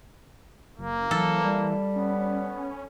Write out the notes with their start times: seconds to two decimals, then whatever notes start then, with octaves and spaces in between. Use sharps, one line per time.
0.78 F#1 A#3
1.11 E3 F#3 A4
1.42 G3
1.96 B3 C#4